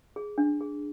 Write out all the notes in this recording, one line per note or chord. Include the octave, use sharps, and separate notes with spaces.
G#4
D4
G#4